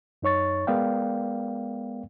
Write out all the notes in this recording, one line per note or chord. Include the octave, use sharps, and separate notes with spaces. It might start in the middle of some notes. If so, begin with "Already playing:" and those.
F#2 D#4 C#5 C#6 A6
G#3 B3 A#4 D5 F5 G5